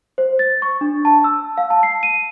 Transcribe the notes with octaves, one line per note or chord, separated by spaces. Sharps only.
C5
A6
C#6
D4
A5
E6
F5
A5
C7
D#7